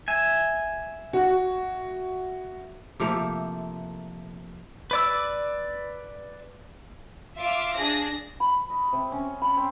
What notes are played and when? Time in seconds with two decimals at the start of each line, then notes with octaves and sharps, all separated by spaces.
0.08 E5 G#5
1.13 F#4
3.00 C3 F3 A3 A#3
4.91 B4 D5 E6
7.38 F4 E5 F5 D6
7.77 D4 G#4 A#6
8.40 B5
8.70 D#5
8.93 C3
9.12 C#4
9.42 B5
9.57 C4